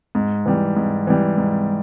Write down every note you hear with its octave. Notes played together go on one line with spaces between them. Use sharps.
G#2
E3 G3
G#2
E3 G3
G#2